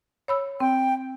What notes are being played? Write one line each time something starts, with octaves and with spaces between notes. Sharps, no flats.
C#5 B5 E6
C4 G5